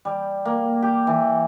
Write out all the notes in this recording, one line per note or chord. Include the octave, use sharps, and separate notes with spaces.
G3
A#3
G4
E3